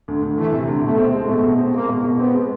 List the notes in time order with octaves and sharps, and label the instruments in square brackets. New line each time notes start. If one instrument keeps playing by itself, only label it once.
[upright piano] D2
D2
[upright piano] E3 [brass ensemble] A3
[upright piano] C3
D2
[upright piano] B2 [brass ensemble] A3
[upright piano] C4
G#3
[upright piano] B2 [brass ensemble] A3
[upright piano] B2
C4
[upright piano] G#3 [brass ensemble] A#3
[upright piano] B2
B2
[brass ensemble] B3 [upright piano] C4
[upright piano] G#3